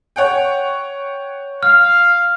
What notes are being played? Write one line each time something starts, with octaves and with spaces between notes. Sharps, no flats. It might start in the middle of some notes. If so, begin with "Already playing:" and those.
C#5 F#5 G5
F5 F6